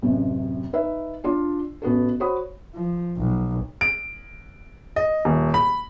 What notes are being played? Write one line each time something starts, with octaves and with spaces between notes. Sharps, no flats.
A1 F#2 C3
D#4 B4 E5
D4 F4 D5 C6
A1 B3 F#4 A4
F#4 C5 C#5 B5 D#6
F3
B1
D7
D#5
D#1
B5